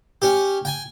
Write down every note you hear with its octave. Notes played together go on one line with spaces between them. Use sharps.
C#4 G4
G5 G#5